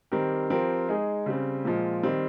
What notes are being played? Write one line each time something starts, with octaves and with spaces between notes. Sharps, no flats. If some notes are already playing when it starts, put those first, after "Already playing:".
D#3 G3 C4 G4 A#4
F3 C4 G4 A#4
G#3 D#4 G#4
C#3 G3 C4
A#2 F3 G#3
D#3 G3 C4